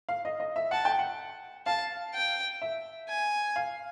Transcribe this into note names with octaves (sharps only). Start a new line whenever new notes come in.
F5
D#5
D#5
E5
F#5 A5
G5
F#5
F5 A5
G5
E5
G#5
F5